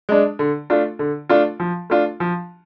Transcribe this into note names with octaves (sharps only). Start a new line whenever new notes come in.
G#3 D4
D3
A3 D4 F4
D3
A3 D4 F4
F3
A3 D4 F4
F3